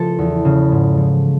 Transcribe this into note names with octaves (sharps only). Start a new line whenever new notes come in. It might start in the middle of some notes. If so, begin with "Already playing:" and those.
Already playing: C#3 F3 A3 A4
E2
C#3
G#2
F3